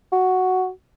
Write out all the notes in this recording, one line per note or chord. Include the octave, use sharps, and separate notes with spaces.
F#4